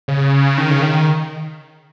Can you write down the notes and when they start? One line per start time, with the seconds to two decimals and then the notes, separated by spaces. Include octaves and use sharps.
0.08 C#3
0.58 D#3
0.71 C#3
0.82 D#3